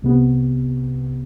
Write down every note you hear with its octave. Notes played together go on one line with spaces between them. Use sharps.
C2 C3 B3